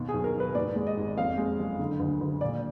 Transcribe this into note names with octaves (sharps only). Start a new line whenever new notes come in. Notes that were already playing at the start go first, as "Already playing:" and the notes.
Already playing: D#2 B2
G#4
B1
A#4
B1
B4
G#2 D5
G#3
D#5
G#1
F2 F5
G#3
F#1
D3
D2
D2
A#2 D5